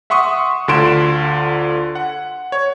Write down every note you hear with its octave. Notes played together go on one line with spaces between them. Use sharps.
E5 F#5 C6 C#6 D#6
D2 D3 F4 C6 D7 E7
F#5
C#5